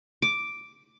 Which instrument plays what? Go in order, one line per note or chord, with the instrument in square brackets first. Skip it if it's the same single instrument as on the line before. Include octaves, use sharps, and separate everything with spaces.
[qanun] D6